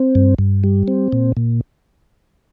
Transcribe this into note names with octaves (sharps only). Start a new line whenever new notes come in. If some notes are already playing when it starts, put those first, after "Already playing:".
Already playing: C4
G2
G2
G3
C4
A#2
A#2